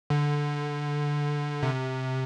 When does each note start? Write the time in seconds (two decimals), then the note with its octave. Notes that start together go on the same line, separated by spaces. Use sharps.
0.10 D3
1.63 C3